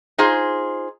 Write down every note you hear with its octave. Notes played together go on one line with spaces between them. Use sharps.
D#4 F4 G#4 C5